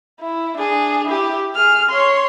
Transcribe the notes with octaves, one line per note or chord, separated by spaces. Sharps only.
E4
D4 G#4
E4 G4
G#4 F6
C#5 C6